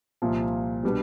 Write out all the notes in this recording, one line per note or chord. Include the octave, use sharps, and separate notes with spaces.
C2 A#2 F3
B2 G3 B3 D4